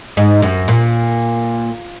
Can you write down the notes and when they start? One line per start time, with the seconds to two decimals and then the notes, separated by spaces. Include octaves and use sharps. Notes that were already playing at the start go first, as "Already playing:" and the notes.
0.17 G#2
0.42 F#2
0.68 A#2